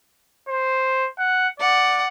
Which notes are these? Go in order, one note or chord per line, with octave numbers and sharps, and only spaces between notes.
C5
F#5
D5 F#5